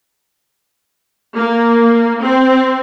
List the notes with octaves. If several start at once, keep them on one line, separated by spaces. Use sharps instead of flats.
A#3
C4